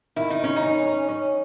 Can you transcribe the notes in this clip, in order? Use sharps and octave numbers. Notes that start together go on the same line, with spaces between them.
D#3 E4
D#4
D#3 C#4
D#4
C#4
C#4
C#4